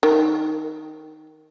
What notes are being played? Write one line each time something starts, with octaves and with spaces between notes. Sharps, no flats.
D#3